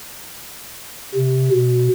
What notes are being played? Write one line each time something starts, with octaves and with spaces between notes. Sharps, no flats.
C3
B2